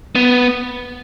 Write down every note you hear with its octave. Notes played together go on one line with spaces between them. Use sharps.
B3